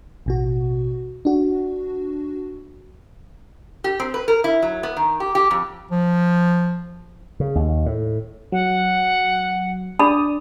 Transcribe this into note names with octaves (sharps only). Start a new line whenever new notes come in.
A1 B2 F#4
D4 F#4
G4
C4
B4
A#4
E4
F#3
B3
D#3
G4
G4
F2
F3
C#3
D#2
A2
F#3 F#5
D4 D5 B5 D#6